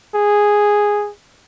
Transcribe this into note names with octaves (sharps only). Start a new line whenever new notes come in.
G#4